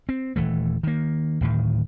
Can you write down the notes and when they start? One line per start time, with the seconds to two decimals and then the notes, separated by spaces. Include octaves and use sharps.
0.09 C4
0.36 D#1 E3 A3
0.83 D#3 A#3
1.41 D1 A2 D#3